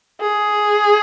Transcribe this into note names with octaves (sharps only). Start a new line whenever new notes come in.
G#4